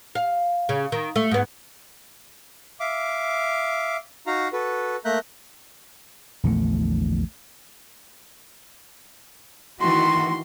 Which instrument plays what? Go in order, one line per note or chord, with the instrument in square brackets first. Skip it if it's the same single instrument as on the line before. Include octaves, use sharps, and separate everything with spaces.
[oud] F5
C#3
D#3
A3
G#2 B3
[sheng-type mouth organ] E5 F5 D6
D#4 F#4 F5 A#5
F#4 A4 B4
A3 A#3 E5 A#5 F#6 G6
[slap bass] A#1 E2 D3 A3
[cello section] D#3 E3 F#4 [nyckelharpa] C6